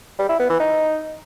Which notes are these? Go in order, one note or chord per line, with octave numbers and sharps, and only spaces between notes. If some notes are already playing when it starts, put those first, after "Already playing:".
G3
E4
B3
E3
D#4